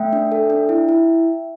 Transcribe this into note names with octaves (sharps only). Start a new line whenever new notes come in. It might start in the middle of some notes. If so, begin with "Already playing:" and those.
Already playing: A3 E5 G5
D4
A4
D4
E4
E4